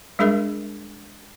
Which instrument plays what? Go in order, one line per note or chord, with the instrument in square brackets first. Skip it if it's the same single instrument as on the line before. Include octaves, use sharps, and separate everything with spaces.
[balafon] G3 G#3 D4 G#4 A#4 E5